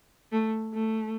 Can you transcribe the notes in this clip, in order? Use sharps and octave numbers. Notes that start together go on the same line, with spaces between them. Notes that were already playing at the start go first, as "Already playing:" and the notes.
A3
A3